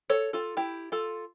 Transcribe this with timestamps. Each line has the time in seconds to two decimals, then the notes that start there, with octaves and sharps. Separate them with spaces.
0.10 A4 C#5
0.33 F4 A4
0.57 E4 G4
0.92 F4 A4